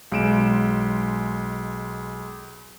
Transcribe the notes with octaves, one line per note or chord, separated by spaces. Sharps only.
B1 G#3 D7 E7